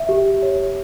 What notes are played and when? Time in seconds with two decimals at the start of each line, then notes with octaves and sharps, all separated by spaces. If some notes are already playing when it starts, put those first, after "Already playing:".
Already playing: E5
0.09 G4
0.42 C#5